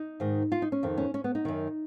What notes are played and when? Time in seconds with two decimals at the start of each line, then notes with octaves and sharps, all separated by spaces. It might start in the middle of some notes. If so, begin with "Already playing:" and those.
Already playing: D#4
0.20 G#2 D#3
0.52 F4
0.62 D#4
0.72 C#4
0.83 F2 D#3
0.98 C#4
1.14 C#4
1.24 B3
1.35 D#4
1.45 F#2 D#3